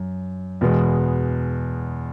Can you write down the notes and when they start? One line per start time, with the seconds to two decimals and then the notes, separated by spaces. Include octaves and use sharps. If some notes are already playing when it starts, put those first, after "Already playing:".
Already playing: F#2
0.61 E2 B2 G#3 B3